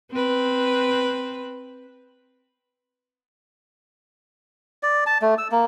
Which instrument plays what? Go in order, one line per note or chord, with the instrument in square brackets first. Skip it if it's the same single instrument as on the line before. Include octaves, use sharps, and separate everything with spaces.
[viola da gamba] C4 B4
[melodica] D5
A5
A3
E6
A#3